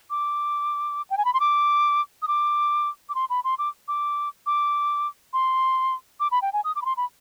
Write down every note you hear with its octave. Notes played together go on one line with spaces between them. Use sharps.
D6
G5
G#5
B5
C6
D6
D#6
D6
D6
C6
B5
C6
D6
D6
D6
C6
D6
B5
G5
G#5
D#6
D6
B5
C6
B5